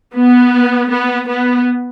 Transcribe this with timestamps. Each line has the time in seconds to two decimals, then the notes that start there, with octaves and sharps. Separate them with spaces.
0.15 B3
0.90 B3
1.27 B3